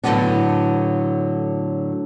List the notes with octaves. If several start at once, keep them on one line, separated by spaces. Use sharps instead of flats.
A2 D3 F3 F#3 B3 D4